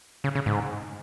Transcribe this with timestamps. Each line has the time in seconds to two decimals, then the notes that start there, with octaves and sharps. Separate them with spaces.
0.24 C#3
0.35 C#3
0.46 G#2